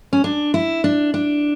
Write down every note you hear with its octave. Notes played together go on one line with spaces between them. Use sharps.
C#4
D4
E4
D4
D4